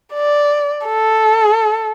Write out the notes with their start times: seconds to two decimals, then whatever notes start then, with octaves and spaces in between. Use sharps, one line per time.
0.13 D5
0.87 A4